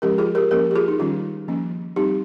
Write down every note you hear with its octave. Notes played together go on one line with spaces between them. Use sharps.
F3 G#3 C#4 G4 A#4
F4 G#4
G4 A#4
F3 A#3 C#4 G4 A#4
G4
F4 G#4
D#4
D#3 G3 C#4 F4
F3 A#3 C#4
G3 C4 D#4 G4